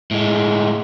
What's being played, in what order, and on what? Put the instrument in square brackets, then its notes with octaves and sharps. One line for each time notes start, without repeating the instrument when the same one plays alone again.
[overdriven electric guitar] A2 G#3